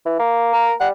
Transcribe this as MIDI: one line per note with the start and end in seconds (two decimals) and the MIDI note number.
0.06 0.16 52
0.19 0.71 58
0.53 0.73 70
0.80 0.92 55
0.80 0.88 78